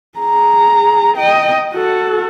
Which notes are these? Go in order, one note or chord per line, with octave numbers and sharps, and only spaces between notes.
G#4 A#5
D#5 G5
F#4 A4